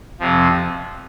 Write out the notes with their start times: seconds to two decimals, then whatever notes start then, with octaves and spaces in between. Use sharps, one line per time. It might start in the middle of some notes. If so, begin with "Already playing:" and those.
0.20 F2 C3 F3